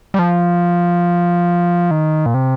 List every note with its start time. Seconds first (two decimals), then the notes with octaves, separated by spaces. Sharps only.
0.14 G3
0.19 F3
1.91 D#3
2.26 A#2
2.34 C3